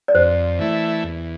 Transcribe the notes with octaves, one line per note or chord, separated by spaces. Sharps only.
D5
F2 C5
E3 A3 E4
E2